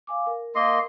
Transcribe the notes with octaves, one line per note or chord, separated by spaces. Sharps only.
F5 G#5 D6
A#4
A#3 D#5 C6